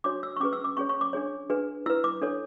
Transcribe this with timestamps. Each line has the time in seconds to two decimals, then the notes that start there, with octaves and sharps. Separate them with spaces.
0.04 D4 F#4 C#5 D6
0.23 E6
0.36 C#6
0.40 C#4 G#4 B4 D6
0.53 E6
0.64 D6
0.77 C#4 G#4 C#5 C#6
0.89 C#6
1.01 D6
1.13 D4 G#4 C#5
1.50 D4 G#4 B4
1.86 E4 E6
1.90 B4
2.04 D6
2.22 D4 A4 C#5